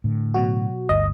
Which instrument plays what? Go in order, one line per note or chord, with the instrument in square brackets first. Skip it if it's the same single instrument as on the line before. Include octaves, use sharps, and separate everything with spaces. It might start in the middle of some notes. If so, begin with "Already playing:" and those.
[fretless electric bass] A2 D3
[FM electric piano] B2 F#3 F#4
[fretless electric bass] G1 D2 G2 [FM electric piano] D#5